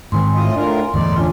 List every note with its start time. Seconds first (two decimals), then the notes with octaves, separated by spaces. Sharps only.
0.12 G#2 D#3 C4 G#5 C6
0.35 A2 F4 D#5
0.56 A2 D4 F4 A#4
0.94 G1 E2 A2 D#4 D5 C6
1.16 C#4 D4 F4